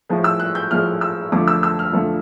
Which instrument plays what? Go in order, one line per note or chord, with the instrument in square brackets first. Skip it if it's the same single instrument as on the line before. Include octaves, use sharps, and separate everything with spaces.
[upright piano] A2 F3 G#3
E6
F#6
G6
A2 F3 G#3 F6
E6
F2 D3 F3 A3 D6
E6
E6
F6
F2 D3 F3 A3